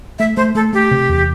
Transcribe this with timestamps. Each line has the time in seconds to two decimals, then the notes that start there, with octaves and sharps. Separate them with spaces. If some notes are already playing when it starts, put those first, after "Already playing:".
0.19 A3 E5
0.37 A3 C5
0.55 A3 A4
0.73 A3 G4
0.91 C3
1.09 E2